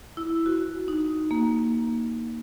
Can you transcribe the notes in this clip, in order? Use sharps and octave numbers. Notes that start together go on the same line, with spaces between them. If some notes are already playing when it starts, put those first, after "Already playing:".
E4
F#4
D#4
A#3